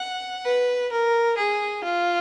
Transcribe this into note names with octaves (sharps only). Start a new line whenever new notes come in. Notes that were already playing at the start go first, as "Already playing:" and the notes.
Already playing: F#5
B4
A#4
G#4
F4